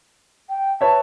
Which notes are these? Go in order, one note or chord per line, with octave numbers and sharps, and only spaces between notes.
G5
B4 C#5 E5 A5